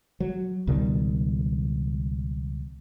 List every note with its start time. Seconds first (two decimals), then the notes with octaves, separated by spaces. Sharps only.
0.20 F#3
0.67 C#2 B2 D#3 G3